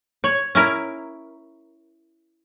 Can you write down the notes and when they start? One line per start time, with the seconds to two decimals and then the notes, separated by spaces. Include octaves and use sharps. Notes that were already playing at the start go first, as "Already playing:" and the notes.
0.24 C#5
0.55 C#4 E4 A#4